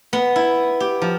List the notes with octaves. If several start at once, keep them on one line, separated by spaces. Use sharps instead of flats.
B3
E4
G4
F3